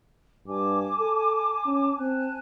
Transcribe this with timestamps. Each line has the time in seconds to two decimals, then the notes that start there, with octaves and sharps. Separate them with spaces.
0.48 G2 G#5 A5 D6
0.99 A4
1.66 C#4
1.99 C4 G#5 A5 F#6